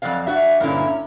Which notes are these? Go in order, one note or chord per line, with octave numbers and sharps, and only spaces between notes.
F2 G#2 F#3 D5 F5
D4 F#4 E5
G2 A#2 D3 A#3 C#4 E4
C#4